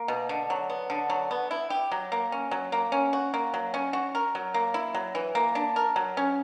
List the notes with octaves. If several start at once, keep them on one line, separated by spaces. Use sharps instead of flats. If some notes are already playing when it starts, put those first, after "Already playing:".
Already playing: A#3
B2
D3
F#3
B3
D3
F#3
B3
E4
G4
F#3
A#3
C#4
F#3
A#3
C#4
F#4
A#3
F#3
C#4
F#4
A#4
F#3
A#3
E4
F#3
E3
A#3
D4
A#4
F#3
C#4